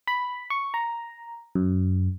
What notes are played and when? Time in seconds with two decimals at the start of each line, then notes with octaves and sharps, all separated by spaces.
0.07 B5
0.50 C#6
0.74 A#5
1.55 F#2